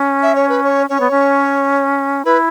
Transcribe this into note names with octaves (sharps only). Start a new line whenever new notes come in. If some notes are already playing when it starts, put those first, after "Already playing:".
Already playing: C#4
E5
C#5
B4
C#5
C#4 C#5
B3
C#4
E4 B4